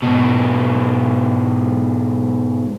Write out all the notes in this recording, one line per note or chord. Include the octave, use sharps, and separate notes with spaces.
G#2 B2